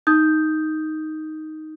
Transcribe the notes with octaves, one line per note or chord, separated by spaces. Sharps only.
D#4 D#6 G6